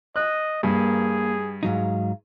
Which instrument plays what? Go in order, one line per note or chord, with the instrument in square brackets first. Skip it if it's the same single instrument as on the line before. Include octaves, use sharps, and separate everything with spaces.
[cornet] D#5 [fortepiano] F#6
[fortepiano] G2 [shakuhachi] A#3 [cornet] G#4
[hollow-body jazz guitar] G#2 F#3 D#4 [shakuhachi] F5